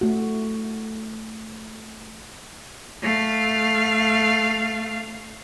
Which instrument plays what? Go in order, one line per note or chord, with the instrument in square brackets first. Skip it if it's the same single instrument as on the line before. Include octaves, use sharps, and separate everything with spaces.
[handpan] A3 F#4
[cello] A3 F5